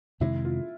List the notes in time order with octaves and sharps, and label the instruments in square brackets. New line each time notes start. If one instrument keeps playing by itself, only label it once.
[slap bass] F2 C3 D#3 G#3 [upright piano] E4
[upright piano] F4